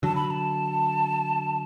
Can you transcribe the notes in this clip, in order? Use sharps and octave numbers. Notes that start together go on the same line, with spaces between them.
D3 F#3 A5
B5
B5
A5